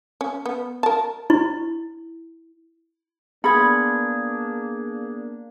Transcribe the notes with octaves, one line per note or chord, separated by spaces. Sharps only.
C#4
B3
A#4 A5
E4
A#3 B3 D4 G#4 B5 G#6